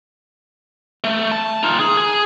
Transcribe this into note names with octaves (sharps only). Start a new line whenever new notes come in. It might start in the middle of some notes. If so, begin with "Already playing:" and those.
A3
A5
D#4 F4
G#4
G#4